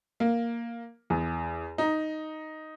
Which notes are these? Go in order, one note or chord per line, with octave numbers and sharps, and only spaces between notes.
A#3
E2
D#4